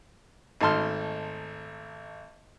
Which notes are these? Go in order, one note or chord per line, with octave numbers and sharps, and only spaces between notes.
G#1 A3 D#4 A5 C6 F6